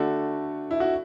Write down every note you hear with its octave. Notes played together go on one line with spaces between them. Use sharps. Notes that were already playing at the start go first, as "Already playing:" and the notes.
Already playing: D3 A3 D4 F#4 A4
E4
F#4